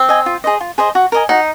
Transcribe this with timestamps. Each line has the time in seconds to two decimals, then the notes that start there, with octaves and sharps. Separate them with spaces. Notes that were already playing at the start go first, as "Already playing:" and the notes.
Already playing: C4
0.09 D#5 G#5
0.26 F4
0.44 G#4 C5 D#5
0.61 F4
0.78 G#4 C5 D#5
0.95 F#4
1.12 A#4 D#5 G#5
1.29 D#4 F#4